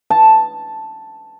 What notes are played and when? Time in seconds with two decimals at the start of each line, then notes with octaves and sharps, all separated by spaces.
0.10 A5